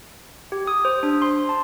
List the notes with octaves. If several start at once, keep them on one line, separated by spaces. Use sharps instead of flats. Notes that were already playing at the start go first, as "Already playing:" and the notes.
G4
D#6
C5
D4
C6
A5